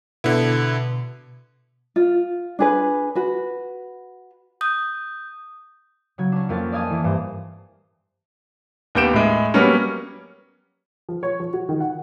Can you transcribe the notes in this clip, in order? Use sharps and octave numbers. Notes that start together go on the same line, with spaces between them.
B2 D3 B3 E4
F4
D4 G#4 B4
F#4 B4
D#6 G6
C#3 F#3 G#6
C#4 D4
F2 A#3 C#4 F4 A6
D5 D#5 F5 G#5 A5 D#6
E3 A#3
G2 C5
D#2 B3 G4 G6 D7 E7
A2 G#3
F#3 G3 A#3 B3 C#4
F3
C#5
F3
F#4
D#3
F#5